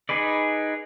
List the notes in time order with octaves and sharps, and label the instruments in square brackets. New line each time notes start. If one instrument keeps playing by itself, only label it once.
[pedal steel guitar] D#4 G#4 B4 D5